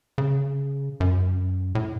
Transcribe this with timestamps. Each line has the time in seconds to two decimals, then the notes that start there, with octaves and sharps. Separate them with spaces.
0.18 C#3
1.00 F#2
1.75 A2